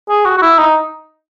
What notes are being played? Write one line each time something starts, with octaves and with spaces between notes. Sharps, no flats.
G#4
F#4
F#4
E4
D#4